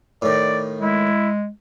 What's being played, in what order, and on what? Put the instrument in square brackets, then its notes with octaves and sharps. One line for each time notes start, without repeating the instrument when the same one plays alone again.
[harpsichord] A2 D#3 [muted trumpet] D5
[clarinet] G#3 [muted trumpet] E4